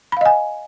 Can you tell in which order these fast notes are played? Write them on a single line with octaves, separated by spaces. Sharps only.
B5 F5 D#5 G#5